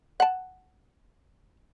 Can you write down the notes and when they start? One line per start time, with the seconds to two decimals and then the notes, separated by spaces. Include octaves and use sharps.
0.20 F#5 A5